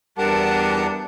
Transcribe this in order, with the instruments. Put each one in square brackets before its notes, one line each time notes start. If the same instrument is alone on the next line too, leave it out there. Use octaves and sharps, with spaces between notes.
[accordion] E2 F#5 A5 [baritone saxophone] G3 [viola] B3 D4 [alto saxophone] A#4